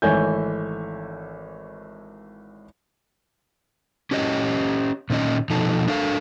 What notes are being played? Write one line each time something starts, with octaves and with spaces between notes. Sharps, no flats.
G#1 E3 A3 C#5 G#5 G6
C#4 G4 C#5 D#5
A#2 D#3 C#4 D#5
B2 F3 D#4 A4
D4 A4 A#4 F5